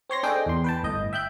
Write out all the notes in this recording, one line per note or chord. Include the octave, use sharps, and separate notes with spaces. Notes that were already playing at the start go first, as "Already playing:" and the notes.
C4 C#5 C6 A#6
C4 D4 G#4 A4 D#5 G5
E2 C6
B4 G5 A5
G1 A2 D#5 G6
E5 G5 F#6 G6